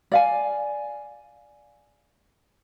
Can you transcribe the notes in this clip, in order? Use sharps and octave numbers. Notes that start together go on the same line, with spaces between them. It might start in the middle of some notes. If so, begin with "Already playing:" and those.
D5 F5 G#5